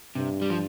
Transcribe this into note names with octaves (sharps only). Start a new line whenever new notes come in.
G2 C3
G3
F3